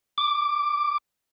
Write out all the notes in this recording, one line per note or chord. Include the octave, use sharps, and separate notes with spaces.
D6